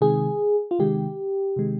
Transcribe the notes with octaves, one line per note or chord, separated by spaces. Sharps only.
C3 D#3 G#3 G#4
F4
C3 D#3 G#3 G4
C3 D#3 G#3